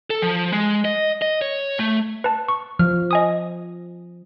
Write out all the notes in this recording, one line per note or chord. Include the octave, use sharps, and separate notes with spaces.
A4
F3
G#3
D#5
D#5
C#5
A3
B4 A5
C#6
F3 F6
D#5 G#5 D#6